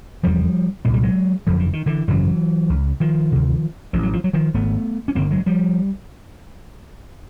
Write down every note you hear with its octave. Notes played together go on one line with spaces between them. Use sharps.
F1 E2 C#3 F3 G3
C2 A#2 G#3
G3
F#3 G#3
F#1 F2 D3 F3
E3
D#3
D3 E3
G#1 F#2 C#3 E3 F#3
C#2 C#3
D#3 F3
D2 C3
A1 A2 F3
F#3
F3
F#3
D#3 F3
G#1 G#2 A3 B3
C#4
G1 G2 D3 A#3 C4
F#3 G#3
F3 G3